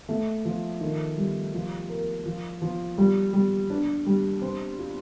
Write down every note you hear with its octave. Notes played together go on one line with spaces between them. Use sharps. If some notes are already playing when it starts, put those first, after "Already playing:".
A3
F3
D#3
G3
F3
A#4
F3
F3
G3
G3
D4
G3
C4
F4